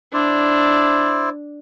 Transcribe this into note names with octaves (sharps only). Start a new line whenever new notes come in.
D4 E4 C5 D5